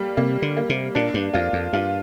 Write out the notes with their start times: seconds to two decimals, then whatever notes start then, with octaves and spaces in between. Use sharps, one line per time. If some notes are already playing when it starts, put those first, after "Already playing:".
Already playing: G3 A#3
0.17 C3 A#3
0.42 D3
0.57 A#3
0.70 C3
0.95 A#2 D4
1.14 G2
1.34 F2 F4
1.53 F2
1.73 G2 F4